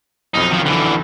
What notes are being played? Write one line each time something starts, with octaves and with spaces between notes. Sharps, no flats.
B1 F2 D#4
D#3 F3
D3 E3